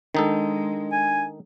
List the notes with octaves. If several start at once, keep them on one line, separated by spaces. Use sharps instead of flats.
D#3 G#3 D4 D#4 A4
G#5